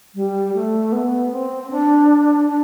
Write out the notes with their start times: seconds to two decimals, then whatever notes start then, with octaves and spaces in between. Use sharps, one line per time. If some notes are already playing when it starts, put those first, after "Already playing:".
0.15 G3
0.54 A3
0.92 B3
1.32 C4
1.71 D4
2.48 D4